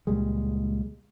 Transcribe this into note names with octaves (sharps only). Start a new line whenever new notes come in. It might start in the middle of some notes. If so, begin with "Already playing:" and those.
C#2 A#2 G3 G#3